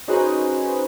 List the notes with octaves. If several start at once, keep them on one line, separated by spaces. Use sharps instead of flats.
C#4 D#4 F#4 G#4 B4 C5